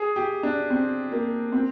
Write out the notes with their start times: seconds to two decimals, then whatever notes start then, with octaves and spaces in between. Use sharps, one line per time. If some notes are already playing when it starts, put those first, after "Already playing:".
Already playing: G#4
0.16 G4
0.43 D4
0.70 C4
1.12 A#3
1.52 C4